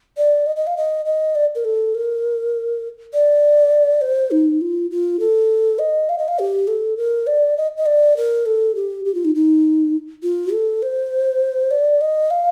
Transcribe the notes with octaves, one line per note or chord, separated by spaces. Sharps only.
D5
D#5
D#5
F5
D#5
D#5
D5
A#4
A4
A#4
D5
C5
D#4
F4
F4
A4
D#5
F5
D#5
F5
G4
A4
A#4
D5
D#5
D#5
D5
A#4
A4
G4
G4
F4
D#4
D#4
F4
A4
C5
D5
D#5
F5